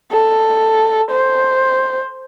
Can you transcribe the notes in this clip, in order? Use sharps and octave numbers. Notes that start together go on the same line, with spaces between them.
A4
C5